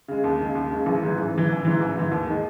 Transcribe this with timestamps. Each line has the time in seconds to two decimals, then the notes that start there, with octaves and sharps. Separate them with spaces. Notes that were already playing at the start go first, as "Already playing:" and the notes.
0.08 C#3 G#3
0.24 D#2
0.39 C#3 G#3
0.55 D#2
0.70 C#3 G#3
0.86 A1
1.02 G#2 E3
1.18 A1
1.34 G#2 E3
1.50 A1
1.65 G#2 E3
1.81 A1
1.96 G#2 E3
2.12 D#2
2.27 D#3 G#3 D#4